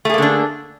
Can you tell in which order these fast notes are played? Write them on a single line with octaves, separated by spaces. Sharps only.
A3 G#4 A#3 D3 D4